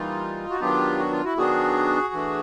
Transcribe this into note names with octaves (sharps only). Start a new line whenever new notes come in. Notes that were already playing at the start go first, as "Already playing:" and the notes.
Already playing: E3 G3 A#3 D#4 F4
F#4
D#3 F#3 B3 D4 F4 G4
F#4
F4
E4 F#4
D#3 F#3 B3 D4 F#4 G#4
E3 A3 D4